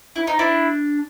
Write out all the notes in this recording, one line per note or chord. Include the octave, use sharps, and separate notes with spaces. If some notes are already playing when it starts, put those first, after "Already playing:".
E4
D#4
D4 E4